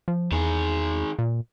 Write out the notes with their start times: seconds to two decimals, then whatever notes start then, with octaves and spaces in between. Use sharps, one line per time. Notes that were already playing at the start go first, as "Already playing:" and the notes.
0.08 F3
0.32 E2 D#3 G#4
1.19 A#2